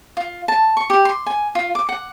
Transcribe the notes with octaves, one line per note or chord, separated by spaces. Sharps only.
F4
A5
C#6
G4
C6
G#5
F4
D6
F#5